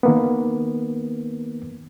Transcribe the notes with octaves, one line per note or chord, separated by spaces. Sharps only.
D#3 A#3 B3